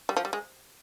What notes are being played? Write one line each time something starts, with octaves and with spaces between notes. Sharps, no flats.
G3
F3
G3
G#3